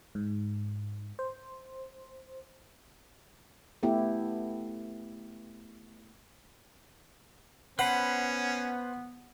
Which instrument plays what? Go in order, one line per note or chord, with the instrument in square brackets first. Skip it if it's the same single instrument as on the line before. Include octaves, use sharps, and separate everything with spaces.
[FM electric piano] G#2
C5
[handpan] A3 B3 E4 G4
[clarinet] B3 [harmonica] C#4 [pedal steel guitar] B4 C5 B5 [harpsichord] F#5